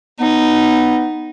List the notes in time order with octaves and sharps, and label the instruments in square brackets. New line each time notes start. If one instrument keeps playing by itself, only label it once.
[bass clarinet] B3 [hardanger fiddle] D#4